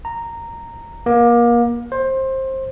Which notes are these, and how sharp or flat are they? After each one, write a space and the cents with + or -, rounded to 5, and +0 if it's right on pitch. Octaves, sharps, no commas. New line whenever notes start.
A#5 -10
A#3 +30
C5 +20